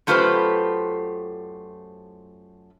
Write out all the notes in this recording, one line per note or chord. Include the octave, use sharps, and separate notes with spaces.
F#2 A3 F4 G4 B4 C5